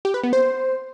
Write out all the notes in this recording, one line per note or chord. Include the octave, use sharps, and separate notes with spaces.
G4
B4
B3
C5